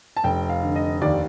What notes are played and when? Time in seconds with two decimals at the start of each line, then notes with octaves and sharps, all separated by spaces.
0.17 A5
0.24 F1 G5
0.49 F5
0.63 D3
0.76 D#5
1.02 D#2 D5